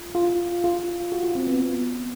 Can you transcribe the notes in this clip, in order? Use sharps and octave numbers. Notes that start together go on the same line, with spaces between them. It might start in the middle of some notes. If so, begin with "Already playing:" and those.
Already playing: F4
F4
F4
F#4
F4
C4
B3
B3